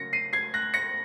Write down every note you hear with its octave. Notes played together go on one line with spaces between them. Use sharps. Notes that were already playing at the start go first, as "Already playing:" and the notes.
Already playing: C#3 F#3 A#3 A#6 C#7
C7 D#7
G#6 C7
F#6 A#6
A#6 C#7